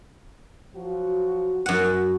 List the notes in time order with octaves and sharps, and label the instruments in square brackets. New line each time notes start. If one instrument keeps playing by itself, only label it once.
[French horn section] F3 F#3 F#4
[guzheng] F#2 F#5 [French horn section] F#4